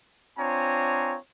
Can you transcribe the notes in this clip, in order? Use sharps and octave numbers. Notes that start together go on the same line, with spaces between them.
C4 D4 F4 C#5 G#5 A#5